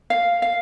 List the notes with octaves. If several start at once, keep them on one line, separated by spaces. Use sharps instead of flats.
F5
F5